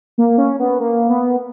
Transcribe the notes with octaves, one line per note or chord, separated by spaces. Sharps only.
A#3
C#4
B3
A#3
B3